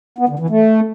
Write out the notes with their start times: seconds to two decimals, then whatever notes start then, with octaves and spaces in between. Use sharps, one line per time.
0.18 B3
0.29 D3
0.39 E3
0.50 A3